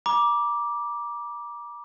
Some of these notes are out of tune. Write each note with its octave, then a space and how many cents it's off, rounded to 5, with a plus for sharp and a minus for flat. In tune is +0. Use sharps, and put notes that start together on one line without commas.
A#5 +40 D6 +0